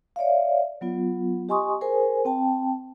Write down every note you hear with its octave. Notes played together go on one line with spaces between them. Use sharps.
C#5 D5 E5 F5
F#3 B3 F4
G4 D#5 G#5 C6 C#6 D#6
G#4 A#4 C5 G#5
C4 G5 A5